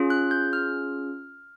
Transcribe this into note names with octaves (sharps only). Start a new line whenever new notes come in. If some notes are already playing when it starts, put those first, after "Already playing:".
Already playing: C#4 F4 G#4
F#6
G6
F6